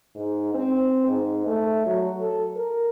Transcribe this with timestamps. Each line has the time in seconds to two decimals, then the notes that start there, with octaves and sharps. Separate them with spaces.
0.15 G#2
0.55 C4
1.07 G#2
1.46 A3
1.86 F#3
2.20 A4
2.56 A#4